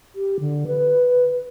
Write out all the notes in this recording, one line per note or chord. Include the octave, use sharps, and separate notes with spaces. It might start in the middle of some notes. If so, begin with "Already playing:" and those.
G4
D3
B4